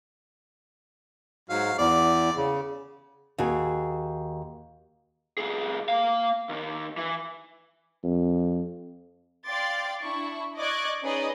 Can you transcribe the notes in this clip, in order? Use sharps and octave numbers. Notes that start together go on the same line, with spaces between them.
G#2 F#3 F5
E2 D5
C#3
D#2 F#4 G#4
C2 G#4
A#3 F5
D#2 D#3
E3
F2
D5 F5 G5 C6 D6 A6
D4 E4 C#6
D5 D#5 C#6 D6 F#6 G#6
C#4 D#4 G#4 B4 D5 D#5